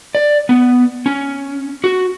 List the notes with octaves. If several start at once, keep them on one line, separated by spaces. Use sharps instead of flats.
D5
B3
C#4
F#4